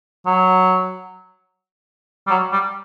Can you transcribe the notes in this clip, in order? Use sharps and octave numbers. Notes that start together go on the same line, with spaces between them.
F#3
G3
F#3
G3